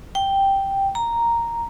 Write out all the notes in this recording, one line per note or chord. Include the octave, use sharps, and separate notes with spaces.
G5
A#5